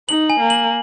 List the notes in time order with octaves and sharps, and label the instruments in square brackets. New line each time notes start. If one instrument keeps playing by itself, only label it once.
[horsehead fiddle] D#4 [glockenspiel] F#7
[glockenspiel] G#5
[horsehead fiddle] A#3
[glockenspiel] F#7